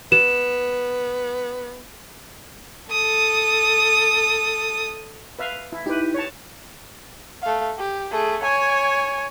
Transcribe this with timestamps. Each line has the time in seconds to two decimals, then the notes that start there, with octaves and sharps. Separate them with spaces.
0.12 B3 E7
2.91 A4 D#6
5.39 B4 E5 F5
5.73 E4
5.86 D#4 E4 G4 B4
6.14 C#5 A5
7.42 A3 F5
7.77 G4
8.11 A3 G#4
8.42 C#5 G#5